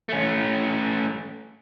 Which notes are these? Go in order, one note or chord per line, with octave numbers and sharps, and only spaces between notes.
A3 C#4